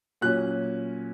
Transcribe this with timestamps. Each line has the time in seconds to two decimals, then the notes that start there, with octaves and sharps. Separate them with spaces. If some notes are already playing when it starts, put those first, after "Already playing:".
0.21 A#2 F#3 C#4 F#6